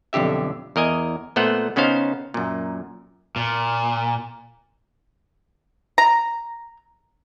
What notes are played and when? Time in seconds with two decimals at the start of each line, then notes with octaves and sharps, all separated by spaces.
0.13 B1 F2 D3 G4 E5
0.76 E2 A#4 D#5 G#5
1.36 A#2 A3 B3 C5 F#5
1.76 C#3 B3 C#4 D#4 C5 F5
2.34 F#2 A#2
3.36 A#2
5.98 A#5